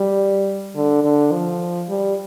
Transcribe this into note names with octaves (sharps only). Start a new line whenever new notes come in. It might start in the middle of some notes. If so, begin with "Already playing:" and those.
Already playing: G3
D3
D3
F3
G3